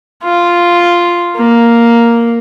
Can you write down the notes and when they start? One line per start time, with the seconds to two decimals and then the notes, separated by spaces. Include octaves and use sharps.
0.23 F4
1.36 A#3